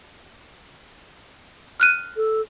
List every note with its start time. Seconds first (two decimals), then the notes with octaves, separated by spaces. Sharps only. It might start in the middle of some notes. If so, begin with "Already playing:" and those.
1.80 F6 F#6 D#7
2.16 A4